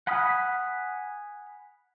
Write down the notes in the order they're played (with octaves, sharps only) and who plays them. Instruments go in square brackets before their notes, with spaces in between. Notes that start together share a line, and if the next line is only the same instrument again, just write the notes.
[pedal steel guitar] F#5 G#5 B5 D#6 F6